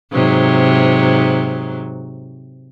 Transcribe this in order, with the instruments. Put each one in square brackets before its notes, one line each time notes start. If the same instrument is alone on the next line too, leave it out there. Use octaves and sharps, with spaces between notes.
[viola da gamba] G#2 C3 F#3